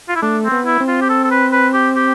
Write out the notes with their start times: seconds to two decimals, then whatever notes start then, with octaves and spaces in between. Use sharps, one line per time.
0.08 F4
0.15 E4
0.22 A3 D4
0.44 C4
0.52 B3
0.65 E4
0.80 C4
0.88 F4
1.01 G4
1.09 A4
1.24 A4
1.31 B4
1.52 B4
1.74 G4
1.96 G4